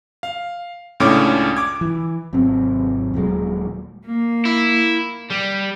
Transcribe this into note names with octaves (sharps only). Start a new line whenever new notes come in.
F5
C#2 A2 C#4 D4 C#5 D6
D6 G#6
E3
G#1 C3 F#3 C4
D#1 A#2 F#3 G#3
A#3
E4
G3